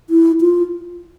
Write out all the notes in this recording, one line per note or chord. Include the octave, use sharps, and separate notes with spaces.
E4
F4